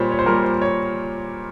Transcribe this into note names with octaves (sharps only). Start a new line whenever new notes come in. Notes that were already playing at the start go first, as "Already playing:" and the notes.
Already playing: A#2 G3 C5 C#5
C#5
C5
A#2 G3 A#4
C5
C#5